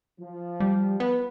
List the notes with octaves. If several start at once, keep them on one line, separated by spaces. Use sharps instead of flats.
F3
G3
B3